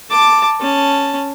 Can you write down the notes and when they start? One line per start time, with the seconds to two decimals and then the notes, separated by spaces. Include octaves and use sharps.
0.11 A5 D6
0.61 C#4 A5